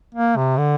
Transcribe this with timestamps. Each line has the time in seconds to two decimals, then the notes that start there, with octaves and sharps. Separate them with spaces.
0.15 A#3
0.36 C3
0.58 D3